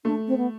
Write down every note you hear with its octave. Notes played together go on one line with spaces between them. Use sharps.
A3 D4
C4
B3